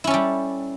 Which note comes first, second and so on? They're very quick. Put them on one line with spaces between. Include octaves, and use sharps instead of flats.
E4 C#4 A4 G3